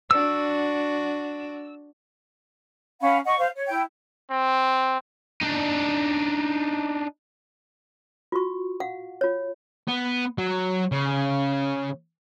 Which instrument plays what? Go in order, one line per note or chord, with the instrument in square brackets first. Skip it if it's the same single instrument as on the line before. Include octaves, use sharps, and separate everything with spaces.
[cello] D4 F#4 [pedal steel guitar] E6
[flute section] C#4 F5 F#5 B5
D#5 F#5 C#6
C5 F5
C#5
E4 G5
[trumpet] C4
[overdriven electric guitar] D4 D#4
[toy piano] F4 F#4 C#6
F5 F#5
F4 C#5
[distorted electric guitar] B3
F#3
C#3